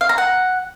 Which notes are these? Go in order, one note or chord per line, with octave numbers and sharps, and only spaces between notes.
F5
A#5
F#5